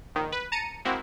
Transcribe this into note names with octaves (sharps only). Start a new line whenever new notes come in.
A#1 D#3
B4
A5 A#5 C#7 D#7
G#3 A#3 C4 E4 F#4